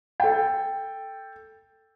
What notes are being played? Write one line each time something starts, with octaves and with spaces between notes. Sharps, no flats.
A4 G5